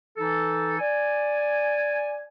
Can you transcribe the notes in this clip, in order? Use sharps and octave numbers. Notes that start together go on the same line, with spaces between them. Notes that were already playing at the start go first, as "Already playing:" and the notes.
E3 D#4 A4
D5 G#5